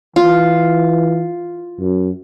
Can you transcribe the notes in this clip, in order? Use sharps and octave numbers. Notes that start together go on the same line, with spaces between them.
E3 F4
F#2